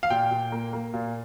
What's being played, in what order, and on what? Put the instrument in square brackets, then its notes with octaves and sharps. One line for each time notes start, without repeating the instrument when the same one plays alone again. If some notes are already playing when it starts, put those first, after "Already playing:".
[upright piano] F5
A#2 G5
A#2
A#3
A#3
A#2